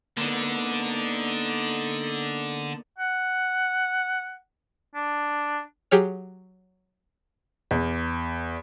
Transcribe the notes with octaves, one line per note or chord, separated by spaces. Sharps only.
D3 A#3 B3 D#4 A4 D5
F#5
D4
F#3 G4 G#4 C#5 F6
E2